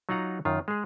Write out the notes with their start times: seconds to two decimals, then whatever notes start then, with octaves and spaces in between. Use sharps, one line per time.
0.09 F#3 D#4 F4 F#5 A#5
0.45 F#2 D#3 F4
0.68 G#3 G#4